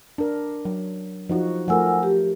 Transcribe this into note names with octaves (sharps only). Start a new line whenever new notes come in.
D4 A#4
F#3
F3 D#4 F#4
F3 A3 A#4 F#5 G#5 E6
G4